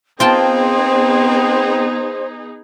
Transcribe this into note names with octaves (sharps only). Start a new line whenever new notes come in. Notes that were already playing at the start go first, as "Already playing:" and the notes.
B3 C4 D#4 F4 G#4 C5 G5 A5